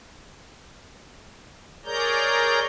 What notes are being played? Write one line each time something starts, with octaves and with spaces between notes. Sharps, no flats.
G#4 A#4 C#5 D5 A#5 G6